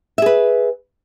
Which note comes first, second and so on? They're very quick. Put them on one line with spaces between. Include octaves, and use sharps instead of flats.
E5 G#4 B4